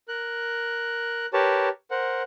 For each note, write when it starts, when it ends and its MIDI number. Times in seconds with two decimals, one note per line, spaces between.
0.08 1.26 70
0.08 1.26 90
1.33 1.69 67
1.33 1.69 70
1.33 1.69 71
1.33 1.69 73
1.33 1.69 81
1.91 2.23 70
1.91 2.23 72
1.91 2.23 78